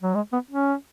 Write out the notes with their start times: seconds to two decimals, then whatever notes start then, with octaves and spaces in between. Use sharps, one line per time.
0.02 F#3
0.15 G#3
0.33 B3
0.51 C#4